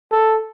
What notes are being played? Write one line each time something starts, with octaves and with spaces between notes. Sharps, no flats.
A4